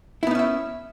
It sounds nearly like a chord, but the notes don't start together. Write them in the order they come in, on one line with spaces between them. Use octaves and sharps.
E4 B3 D#4 C#4 E5